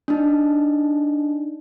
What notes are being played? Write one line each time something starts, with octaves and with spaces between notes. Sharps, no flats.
D4 D#4